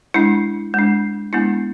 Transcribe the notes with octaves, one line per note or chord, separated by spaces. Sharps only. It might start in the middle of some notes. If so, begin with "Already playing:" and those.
G#3 D4 E4
G#3 D4
G#3 B3 D4 E4